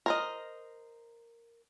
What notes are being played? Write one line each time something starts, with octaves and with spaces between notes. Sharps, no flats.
A#4 C5 D#5